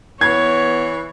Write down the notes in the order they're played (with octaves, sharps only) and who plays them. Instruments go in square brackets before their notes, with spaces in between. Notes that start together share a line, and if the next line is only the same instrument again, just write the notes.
[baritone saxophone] E3 [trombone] B3 [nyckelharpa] C#5 [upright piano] G#6